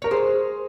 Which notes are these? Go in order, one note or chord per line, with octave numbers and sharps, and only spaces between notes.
A#4 C#5
G#4 C5